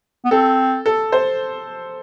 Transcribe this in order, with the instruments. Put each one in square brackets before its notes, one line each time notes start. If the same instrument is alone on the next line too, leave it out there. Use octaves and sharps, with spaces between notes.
[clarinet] B3
[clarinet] C4 [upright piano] A4
[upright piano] A4
C5